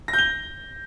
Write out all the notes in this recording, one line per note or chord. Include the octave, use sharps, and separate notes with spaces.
A#6
G6
G7